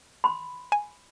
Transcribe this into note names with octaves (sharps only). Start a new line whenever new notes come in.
B5 C6
G#5